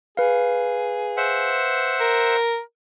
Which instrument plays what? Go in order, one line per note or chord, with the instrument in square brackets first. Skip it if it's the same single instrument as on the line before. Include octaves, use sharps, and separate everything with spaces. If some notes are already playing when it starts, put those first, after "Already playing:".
[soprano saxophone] G#4 [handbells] B4 F5
[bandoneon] C5 E5 F#5
[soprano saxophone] A#4